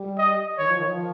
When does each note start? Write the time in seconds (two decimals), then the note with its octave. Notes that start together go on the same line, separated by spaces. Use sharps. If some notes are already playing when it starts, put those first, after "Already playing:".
Already playing: G3
0.18 D#5
0.58 D#3 C#5
0.68 F3
0.79 D#3
0.88 F3